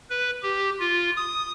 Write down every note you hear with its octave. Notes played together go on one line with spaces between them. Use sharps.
B4
G4
F4
D#6